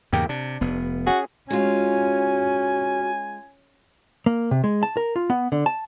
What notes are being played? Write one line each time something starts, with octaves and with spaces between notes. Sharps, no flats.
E2 G#2 C#3 A#3 G4 G5
C3 D4
F1 B3
C#4 F#4 G#4
G#3 C#4 F4 F#4 G#5
A#3
C3
G#3
A5
A#4
F4
B3
D3
A5